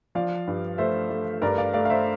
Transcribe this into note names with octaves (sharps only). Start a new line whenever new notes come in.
F3 D5 F5
G2
A3 C5 E5
A3
G2 A#4 D5
D5 F5
A3 D5 F5
F5
C5 E5